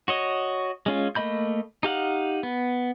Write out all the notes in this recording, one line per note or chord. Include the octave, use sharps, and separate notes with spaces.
F#4 C#5 D#5
G#3 C#4 F4
A3 A#3 D#5 B5 G6
D#4 G4 F5 F#5
B3